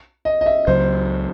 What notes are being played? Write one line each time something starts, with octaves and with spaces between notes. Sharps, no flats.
D#5
D#5
E5
C#2 C#3 F#3 C5